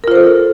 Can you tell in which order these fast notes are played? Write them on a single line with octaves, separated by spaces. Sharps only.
A#4 F4 C5 A4